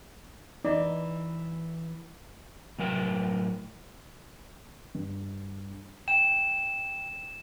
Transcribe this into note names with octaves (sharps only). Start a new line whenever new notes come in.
E3 D#4 D5
A2 F#3 A#4 G5
G2
G5 E7